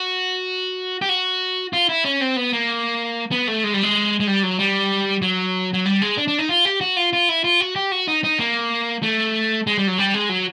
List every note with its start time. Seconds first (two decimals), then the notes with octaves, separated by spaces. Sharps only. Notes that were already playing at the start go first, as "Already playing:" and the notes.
Already playing: F#4
1.02 G4
1.09 F#4
1.73 F4
1.89 E4
2.04 C#4
2.21 C4
2.36 B3
2.53 A#3
3.31 B3
3.48 A3
3.64 G#3
3.74 G3
3.83 G#3
4.20 G#3
4.27 G3
4.43 F#3
4.59 G3
5.22 F#3
5.73 F#3
5.86 G3
6.02 G#3
6.17 D4
6.28 D4
6.39 D#4
6.49 F4
6.65 G4
6.81 F#4
6.97 F4
7.13 F4
7.29 E4
7.44 F4
7.61 F#4
7.76 G4
7.92 F#4
8.08 D#4
8.24 D#4
8.39 A#3
9.03 A3
9.67 G#3
9.78 G3
9.87 F#3
9.98 G3
10.14 G#3
10.29 F#3